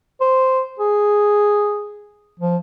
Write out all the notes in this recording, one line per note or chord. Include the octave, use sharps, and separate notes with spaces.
C5
G#4
F3